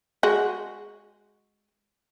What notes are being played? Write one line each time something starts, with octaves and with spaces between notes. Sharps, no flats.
G#3 F#4